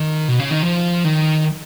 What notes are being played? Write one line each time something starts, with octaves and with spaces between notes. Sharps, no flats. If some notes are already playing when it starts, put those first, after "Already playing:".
Already playing: D#3
B2
C#3
D#3
F3
D#3